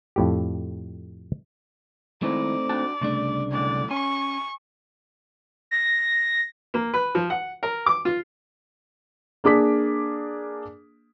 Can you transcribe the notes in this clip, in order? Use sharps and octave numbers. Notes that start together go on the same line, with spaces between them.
F2 A2 G4
D#3 G#3 A3 C4 D#4 E4 D5
D4 F#4 A5
C2 C#3 A3 D4
B1 A2 D3 D5
C#4 G#5 C#6
A#6
A#3
B4
F3
F#5
A#4
D6
F4
A#3 D4 G#4 D6 B6